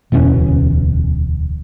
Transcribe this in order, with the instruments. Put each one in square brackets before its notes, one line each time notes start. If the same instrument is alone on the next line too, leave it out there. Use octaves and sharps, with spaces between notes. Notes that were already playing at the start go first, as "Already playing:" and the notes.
[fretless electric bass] D1 E2 B2 C#4